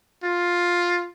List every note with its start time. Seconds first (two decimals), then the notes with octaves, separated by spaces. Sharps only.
0.23 F4